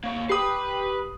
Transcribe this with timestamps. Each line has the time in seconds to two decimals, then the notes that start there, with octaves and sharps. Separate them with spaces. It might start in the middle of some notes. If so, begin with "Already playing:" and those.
0.04 A#3 C#5
0.29 G4 B4 B5 D#6 C7